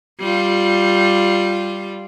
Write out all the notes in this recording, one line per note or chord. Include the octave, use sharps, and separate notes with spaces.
G3 F4